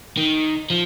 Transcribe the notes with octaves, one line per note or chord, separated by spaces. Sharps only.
D#3
F3